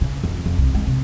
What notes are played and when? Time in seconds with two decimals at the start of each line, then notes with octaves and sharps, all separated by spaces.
0.01 C#3
0.23 F2
0.46 F2
0.58 C2
0.74 G#3
0.87 C3